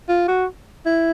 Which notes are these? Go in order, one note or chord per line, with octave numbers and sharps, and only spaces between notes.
F4
F#4
E4